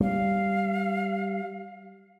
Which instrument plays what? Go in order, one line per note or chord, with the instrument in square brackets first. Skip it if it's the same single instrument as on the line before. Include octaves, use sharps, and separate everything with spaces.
[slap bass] G3 [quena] F5